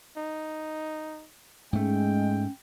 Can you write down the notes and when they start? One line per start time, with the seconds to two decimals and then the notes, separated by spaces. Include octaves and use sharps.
0.17 D#4
1.73 G#2 G#3 A3 C#4 G5